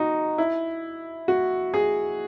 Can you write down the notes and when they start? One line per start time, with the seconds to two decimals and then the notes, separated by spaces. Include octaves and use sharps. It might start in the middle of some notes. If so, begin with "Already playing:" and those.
Already playing: D#4 F#4
0.38 E4
1.28 F#4
1.74 G#4